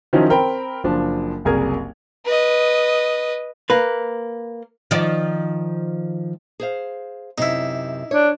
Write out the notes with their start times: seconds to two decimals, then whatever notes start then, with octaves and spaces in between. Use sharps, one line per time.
0.13 D#3 F3 F#3 C#4 D#4 E4
0.30 C4 A#4 G5 B5
0.84 F#1 F3 D4
1.45 F#1 C2 G#4 A#4 G#6
2.25 B4 D#5
3.70 A#3 B4
4.91 D#3 F3 D5
6.60 G#4 C5 F5
7.38 F#2 C3 D#4 E4
8.11 D4 C#5